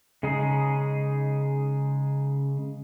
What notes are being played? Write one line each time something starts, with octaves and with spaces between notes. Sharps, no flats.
C#3 G#3 D#4 G#4